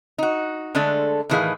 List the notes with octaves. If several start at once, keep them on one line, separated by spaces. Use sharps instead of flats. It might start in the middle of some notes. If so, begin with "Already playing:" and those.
D#4 F#4
D3 G#3 A3 D4 A4
A2 D#3 E3 A3 G#4 F5